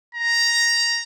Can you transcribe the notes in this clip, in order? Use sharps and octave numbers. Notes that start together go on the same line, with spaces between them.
A#5